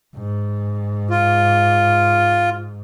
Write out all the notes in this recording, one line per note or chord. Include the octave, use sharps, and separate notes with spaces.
G#2
F4